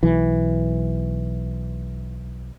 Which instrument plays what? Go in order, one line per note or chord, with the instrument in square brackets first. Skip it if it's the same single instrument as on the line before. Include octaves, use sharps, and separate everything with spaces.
[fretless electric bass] B1 E3